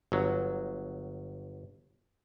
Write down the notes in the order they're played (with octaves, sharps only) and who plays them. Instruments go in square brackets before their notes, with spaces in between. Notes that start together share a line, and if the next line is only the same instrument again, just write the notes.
[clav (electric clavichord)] G1 F#3